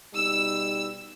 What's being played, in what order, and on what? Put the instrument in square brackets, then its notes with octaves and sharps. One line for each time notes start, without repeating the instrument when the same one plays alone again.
[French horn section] B2 G3 D#4 [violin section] E6